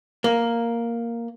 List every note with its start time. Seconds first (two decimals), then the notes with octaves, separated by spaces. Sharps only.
0.24 A#3